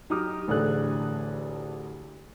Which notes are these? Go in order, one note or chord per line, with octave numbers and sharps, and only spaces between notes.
F#3 D#4 G4 D#6 F6
A1 D2 D3 G#4 A4 F#6